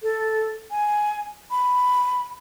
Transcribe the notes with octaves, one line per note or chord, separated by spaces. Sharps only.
A4
G#5
B5